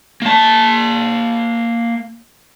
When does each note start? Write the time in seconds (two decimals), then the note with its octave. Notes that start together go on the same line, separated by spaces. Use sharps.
0.22 A#3 A5